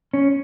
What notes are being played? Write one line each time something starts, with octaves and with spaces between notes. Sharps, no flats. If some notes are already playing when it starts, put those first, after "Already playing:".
C#4